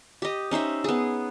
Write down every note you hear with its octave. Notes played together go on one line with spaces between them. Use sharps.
G4 D#5
C#4 D#4 C5 E5
B3 G#4